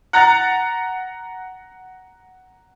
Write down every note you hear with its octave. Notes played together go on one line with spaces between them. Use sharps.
F#5 A#5 F#6 A6